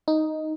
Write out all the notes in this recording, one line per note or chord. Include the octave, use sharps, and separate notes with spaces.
D#4